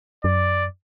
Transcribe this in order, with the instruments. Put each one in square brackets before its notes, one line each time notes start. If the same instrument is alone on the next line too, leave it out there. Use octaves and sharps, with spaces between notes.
[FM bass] F#2 [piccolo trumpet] D5